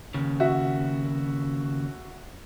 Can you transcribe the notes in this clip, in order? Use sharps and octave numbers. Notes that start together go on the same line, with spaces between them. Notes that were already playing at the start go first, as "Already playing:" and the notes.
D#2 C#3
F#4 E5